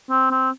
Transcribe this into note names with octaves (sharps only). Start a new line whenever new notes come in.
C4
C4